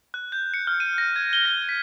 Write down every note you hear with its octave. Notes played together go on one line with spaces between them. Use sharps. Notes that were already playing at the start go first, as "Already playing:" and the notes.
F#6
G6
C#7
F6
D#7
A#6
G#6
G7
A#6
B6